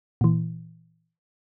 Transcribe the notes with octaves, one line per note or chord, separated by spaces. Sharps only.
A#2 E3